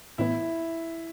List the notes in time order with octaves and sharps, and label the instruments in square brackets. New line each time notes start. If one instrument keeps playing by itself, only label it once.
[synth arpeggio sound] A2 E3 B3 [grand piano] E4